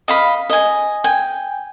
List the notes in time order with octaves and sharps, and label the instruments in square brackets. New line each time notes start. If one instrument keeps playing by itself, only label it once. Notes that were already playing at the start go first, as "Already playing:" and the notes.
[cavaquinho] D#5 F5 B5
D#5 G#5
G5 G#5